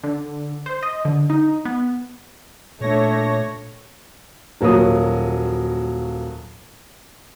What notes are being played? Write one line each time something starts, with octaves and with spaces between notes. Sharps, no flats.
D3
C5
D#5
D3
D#4
B3
A#2 A3 D4 C#5 A#6
D#1 F#3 A#3 F#4 D#6